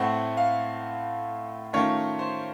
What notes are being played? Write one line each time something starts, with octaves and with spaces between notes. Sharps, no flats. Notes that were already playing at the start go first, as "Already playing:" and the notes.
Already playing: A2 A3 C4 F#5
F5
D#3 A3 C#4 F4 C#5
C5